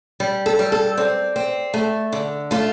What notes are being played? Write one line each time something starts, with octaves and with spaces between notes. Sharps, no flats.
G3
A4
G3
A4
C4 D5
C4
A3
D3
A3 F4